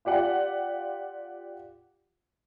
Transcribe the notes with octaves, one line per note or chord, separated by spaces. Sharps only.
F4 G4 D5 F#5